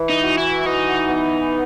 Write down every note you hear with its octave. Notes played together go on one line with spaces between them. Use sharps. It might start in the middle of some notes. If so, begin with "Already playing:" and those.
Already playing: E3
D#4
F#4
E4
E3 D#4
B3